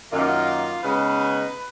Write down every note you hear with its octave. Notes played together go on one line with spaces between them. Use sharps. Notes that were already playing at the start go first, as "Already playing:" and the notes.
F#2 D#3 A#3 D#4 F4
C#3 G#3 B3 D#4 B4